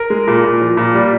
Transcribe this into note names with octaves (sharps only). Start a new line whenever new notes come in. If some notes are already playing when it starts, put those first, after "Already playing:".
Already playing: A#4
G#3
A#2
A#2
F3
A#2
G3